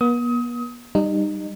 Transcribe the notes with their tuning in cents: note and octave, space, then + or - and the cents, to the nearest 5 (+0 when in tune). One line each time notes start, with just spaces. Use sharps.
B3 -45 D#6 +30
G3 +0 D#4 -25